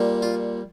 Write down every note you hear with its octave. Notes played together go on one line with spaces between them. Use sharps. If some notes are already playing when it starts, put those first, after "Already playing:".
Already playing: A#2 G3 A#3
F4